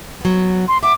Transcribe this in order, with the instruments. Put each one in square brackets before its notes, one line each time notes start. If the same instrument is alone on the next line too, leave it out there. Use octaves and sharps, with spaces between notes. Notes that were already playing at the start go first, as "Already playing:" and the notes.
[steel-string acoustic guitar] F#3 B3
[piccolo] C6
[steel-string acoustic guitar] E5 F#5 [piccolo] D6